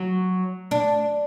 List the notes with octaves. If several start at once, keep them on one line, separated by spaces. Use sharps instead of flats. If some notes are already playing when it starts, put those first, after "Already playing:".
Already playing: F#3
D4